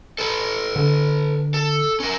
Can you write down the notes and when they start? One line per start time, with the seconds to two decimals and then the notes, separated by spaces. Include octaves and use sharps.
0.18 A4 B4
0.76 D3
1.54 A4
2.00 C#4 A#4